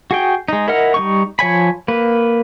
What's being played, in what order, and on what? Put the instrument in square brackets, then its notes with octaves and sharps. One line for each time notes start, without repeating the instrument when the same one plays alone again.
[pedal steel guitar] F#4 G#4 G5
G#3 D#4
E4 A#4 D#5 F#5 F6
G3 D#4 C#6
F3 C#5 G#5 B5
A#3 B4